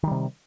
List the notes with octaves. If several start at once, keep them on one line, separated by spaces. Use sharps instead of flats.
C3 D#3 G3